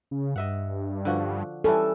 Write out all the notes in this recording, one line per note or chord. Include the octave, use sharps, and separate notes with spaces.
C#3
G2 D#5 E5 F#5
D3 F3 F#4
E3 G3 C#4 A4